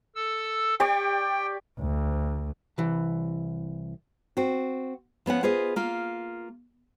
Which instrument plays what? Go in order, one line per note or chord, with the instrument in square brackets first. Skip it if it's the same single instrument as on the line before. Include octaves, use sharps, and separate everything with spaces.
[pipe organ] A4 E6
[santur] G4 D5 C#6 [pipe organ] G5
[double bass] D2
[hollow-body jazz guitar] C2 E3
[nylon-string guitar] C4 F#4
F3 B3 C#4 F#5
F4 G#4 B4 C5 D#5
A#3 F4